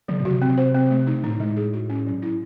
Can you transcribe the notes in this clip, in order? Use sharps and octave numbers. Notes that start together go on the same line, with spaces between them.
C#3 F#3
A2
C3 F#4
C4
C5
C4
A3
D#4
A2 D#4
G#3
G#4
F#4
C#4
F#3
E4